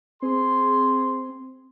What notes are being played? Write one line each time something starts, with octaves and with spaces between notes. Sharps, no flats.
C4 G#4 C6